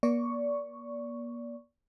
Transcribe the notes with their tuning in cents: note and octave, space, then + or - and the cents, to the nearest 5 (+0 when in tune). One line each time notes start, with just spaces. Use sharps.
A#3 +40 D5 -25 C#6 +0